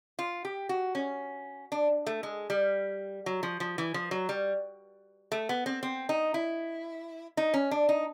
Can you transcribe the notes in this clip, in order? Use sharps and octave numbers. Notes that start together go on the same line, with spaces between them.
F4
G4
F#4
C#4
D4
A3
G#3
G3
F#3
F3
F3
E3
F3
F#3
G3
A3
B3
C4
C4
D#4
E4
D#4
C#4
D4
D#4